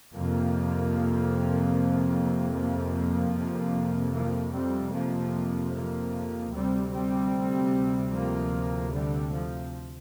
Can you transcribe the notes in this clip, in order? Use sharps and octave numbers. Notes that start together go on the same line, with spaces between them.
F2 C3 F3 A#3
F3 A#3
F2 C3
F3 A#3
G3 C4
F3 A#3
F3 A#3
D2 C3 G3 C4
G3 C4
F3 A#3
D3 G3
F3